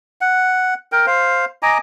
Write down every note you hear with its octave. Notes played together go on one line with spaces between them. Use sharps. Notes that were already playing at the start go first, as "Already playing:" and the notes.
F#5
A#4 G5
C5 F5
D#5 G#5 A#5 D6